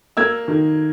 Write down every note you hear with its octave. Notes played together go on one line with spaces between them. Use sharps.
A#3 E6 G#6
D#3